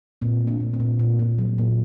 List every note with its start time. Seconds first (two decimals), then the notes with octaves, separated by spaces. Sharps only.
0.22 A#2 C4
0.41 A3
0.47 A#3 D4
0.60 A#2
0.73 C4
0.80 A#2
0.99 A#2
1.19 A#2
1.38 F#3
1.58 A#2